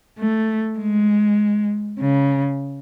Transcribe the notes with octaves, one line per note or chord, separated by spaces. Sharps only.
A3
G#3
C#3